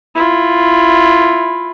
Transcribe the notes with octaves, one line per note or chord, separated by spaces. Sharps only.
E4 F4